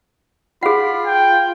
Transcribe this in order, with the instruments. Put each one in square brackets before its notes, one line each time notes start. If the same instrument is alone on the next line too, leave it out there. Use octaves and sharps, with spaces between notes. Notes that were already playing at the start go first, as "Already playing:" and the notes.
[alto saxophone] F4 [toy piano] G#4 F#5 [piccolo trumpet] B5
[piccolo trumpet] G5